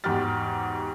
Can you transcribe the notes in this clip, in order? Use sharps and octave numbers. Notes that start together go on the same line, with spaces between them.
E2 G#2 F#4 G4 F6 A6